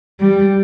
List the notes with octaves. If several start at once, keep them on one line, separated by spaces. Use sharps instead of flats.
G3